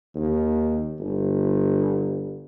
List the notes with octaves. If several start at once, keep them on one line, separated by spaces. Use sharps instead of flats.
D#2
G1